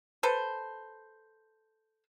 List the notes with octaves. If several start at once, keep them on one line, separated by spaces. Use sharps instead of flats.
A4 B4 C5